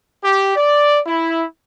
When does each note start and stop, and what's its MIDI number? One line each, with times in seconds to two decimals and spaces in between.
0.24 0.54 67
0.56 1.00 74
1.06 1.44 64